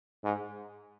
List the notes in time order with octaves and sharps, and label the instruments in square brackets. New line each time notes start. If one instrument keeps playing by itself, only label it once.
[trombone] G#2